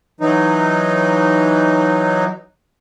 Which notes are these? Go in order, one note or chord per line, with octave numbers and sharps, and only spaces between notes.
E3 F#3 D#4